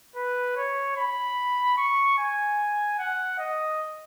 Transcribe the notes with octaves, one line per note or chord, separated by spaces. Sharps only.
B4
C#5
B5
C#6
G#5
F#5
D#5